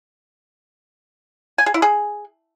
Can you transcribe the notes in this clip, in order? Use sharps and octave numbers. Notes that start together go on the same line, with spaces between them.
G#5
G#4
E4
G#4